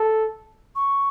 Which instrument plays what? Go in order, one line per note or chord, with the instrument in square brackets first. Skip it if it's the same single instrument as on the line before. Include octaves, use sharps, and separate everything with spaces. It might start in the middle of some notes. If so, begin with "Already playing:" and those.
Already playing: [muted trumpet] A4
[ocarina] C#6